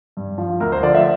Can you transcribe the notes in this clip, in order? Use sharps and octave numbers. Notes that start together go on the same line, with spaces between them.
G2
F3
D2 A#4
C5
D3 F3 D5
E5